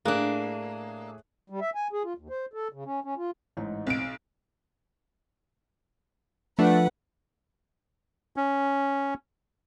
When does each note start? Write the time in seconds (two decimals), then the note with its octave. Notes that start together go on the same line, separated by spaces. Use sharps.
0.05 A2 A#3 D4 G#4 F#6
1.50 G3
1.61 E5
1.75 G#5
1.93 G#4
2.04 F4
2.18 D#2
2.30 C5
2.54 A4
2.73 C#3
2.85 C#4
3.04 C#4
3.17 F4
3.57 A1 G#2 D#4
3.87 B1 C4 D7
6.59 F3 A3 D4 B4 F#5
8.36 C#4